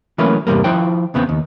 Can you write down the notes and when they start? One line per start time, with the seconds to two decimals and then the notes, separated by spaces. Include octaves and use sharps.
0.18 E3 F#3 A3 A#3 C#4 B4
0.47 E2 G2 C3 G3 A#3
0.64 F3 E4 C5 G5
1.14 E2 C#3 B3 C4
1.29 D#2